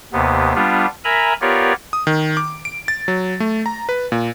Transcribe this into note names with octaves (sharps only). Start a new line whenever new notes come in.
D#2 C3 B3
G3 B3 D4 F4
A#4 E5 G#5 A#5 B5
B3 F4 G4 A#4 C#5 D5
D#6
D#3
D6
D7
A6
F#3
A3
A#5
B4
A#2